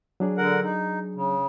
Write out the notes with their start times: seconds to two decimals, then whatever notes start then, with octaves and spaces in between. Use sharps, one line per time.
0.20 F#3 D4 G#4
0.38 D3 A#4 F#5
0.63 D#4
1.15 C#3